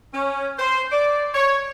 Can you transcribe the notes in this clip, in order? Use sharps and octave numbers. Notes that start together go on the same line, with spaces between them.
C#4
C5
D5
C#5